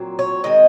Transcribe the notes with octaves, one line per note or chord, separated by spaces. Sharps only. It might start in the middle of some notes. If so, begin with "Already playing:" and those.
Already playing: A#2 F#3 C4
C#5
D#3 G#3 C4 D#5